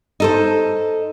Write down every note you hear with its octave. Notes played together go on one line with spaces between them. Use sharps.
D#4 A4 C5